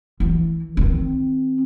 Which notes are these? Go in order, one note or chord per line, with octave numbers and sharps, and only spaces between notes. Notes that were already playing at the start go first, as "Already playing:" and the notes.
E3
D#3 C4